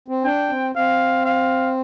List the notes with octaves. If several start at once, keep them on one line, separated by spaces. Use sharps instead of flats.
C4
D4 G5
C4
C4 F5
F5